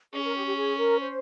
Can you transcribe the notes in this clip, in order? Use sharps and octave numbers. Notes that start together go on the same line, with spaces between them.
C#4 G#4
A#4
G4
G4
G#4
A#4
C5